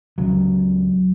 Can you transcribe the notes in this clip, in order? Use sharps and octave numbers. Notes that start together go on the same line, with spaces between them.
C#2 C#3 F#3